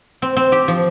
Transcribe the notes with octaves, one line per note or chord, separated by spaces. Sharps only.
C4
C4
G4
F3